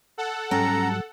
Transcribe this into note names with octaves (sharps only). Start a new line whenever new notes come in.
A4 F#5
G#2 F#3 G3 C#4 G5 A#5